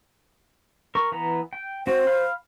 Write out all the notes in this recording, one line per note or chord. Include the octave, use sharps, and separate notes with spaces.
A#4 C#6
E3 B3 A#5
G5
C4 F#4 C5
F5 B5 F6